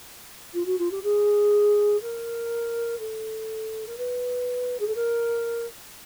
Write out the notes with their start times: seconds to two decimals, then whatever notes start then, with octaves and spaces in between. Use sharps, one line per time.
0.54 F4
0.65 F#4
0.78 F4
0.91 G4
1.03 G#4
2.00 A#4
2.98 A4
3.86 A#4
3.97 B4
4.79 G#4
4.87 A4
4.94 A#4